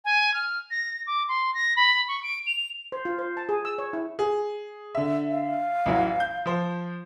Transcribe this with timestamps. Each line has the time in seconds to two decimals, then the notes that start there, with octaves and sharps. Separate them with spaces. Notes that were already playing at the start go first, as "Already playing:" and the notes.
0.05 G#5
0.34 F6
0.71 A#6
1.07 D6
1.28 C6
1.54 A#6
1.76 B5
2.08 C#6
2.23 D7
2.46 F7
2.92 C5
3.05 F4
3.19 C5
3.37 A5
3.49 G#4
3.65 E6
3.78 C#5
3.93 E4
4.19 G#4
4.95 D3 E5
5.31 F5
5.86 A1 E3 F#3
6.20 G6
6.46 F3 C5